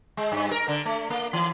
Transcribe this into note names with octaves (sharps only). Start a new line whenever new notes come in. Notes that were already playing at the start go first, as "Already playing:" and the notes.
G#3
G2
A#4
D3
A3
A#3
E3